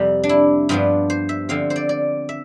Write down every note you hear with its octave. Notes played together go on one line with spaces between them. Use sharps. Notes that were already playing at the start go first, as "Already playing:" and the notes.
Already playing: F2 C3 G3
D4
E4
G2 F3 B3 D4 F4
C5
E5
D3 F3 C4 F5
C5
D5
D5
E5